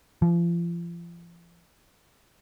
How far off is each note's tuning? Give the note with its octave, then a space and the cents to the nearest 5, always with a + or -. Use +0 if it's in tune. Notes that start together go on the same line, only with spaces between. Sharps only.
F3 -35